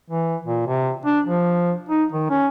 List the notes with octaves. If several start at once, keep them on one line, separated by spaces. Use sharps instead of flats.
E3
A#2
C3
D4
F3
D#4
D#3
C#4